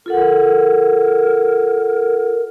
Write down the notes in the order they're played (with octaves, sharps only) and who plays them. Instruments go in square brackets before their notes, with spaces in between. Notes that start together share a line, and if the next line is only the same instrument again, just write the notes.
[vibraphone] F4 A4 F#5 [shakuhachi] A#4